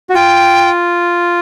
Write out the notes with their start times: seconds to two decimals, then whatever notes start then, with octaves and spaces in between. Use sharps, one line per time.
0.10 F#4
0.14 F4 G5